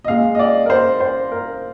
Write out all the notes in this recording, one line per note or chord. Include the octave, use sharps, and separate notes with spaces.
D#5
A#2 G#3 F5
D#5
D5
A#4
C5
C5
A#4